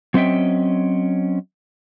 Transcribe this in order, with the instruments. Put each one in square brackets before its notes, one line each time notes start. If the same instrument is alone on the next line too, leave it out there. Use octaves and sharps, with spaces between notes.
[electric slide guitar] F#3 C4 C#4 D#5 E5 G5